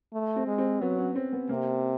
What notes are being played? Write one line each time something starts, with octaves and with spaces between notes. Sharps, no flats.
A3
C4
G#3
C4
F#3 B3
C#4
C4
B3
C3 A#3